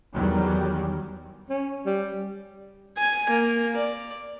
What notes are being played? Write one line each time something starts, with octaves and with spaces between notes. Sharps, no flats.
E2 D#3 F#3 G3
C#4
G3
G#5
A#3
D5